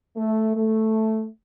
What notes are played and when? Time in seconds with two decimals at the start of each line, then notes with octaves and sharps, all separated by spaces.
0.17 A3
0.56 A3